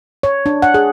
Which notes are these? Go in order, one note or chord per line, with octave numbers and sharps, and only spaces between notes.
C#5
D4
F#5
G#4